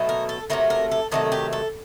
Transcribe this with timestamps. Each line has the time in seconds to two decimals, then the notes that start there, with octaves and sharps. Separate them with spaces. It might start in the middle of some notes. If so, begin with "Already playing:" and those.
Already playing: B2 F#3 A3
0.09 A#4
0.29 A4
0.50 C3 D#3 F#3 A3 A#4
0.70 A#4
0.91 A4
1.12 C3 D#3 F#3 A3 A4
1.32 G4
1.53 A4